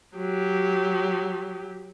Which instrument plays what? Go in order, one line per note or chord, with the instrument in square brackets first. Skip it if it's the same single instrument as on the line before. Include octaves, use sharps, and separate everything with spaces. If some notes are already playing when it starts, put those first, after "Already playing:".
[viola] F#3 G4